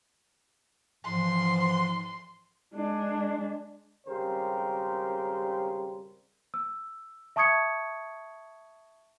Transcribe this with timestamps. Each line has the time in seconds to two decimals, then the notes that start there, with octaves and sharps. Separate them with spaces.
1.05 G#2 E3 F3 C6
2.74 G#3 D4
4.07 G#1 C#3 G3 G4 A#4 C5
6.54 E6
7.36 E5 A5 C#6 D#6 G#6 C#7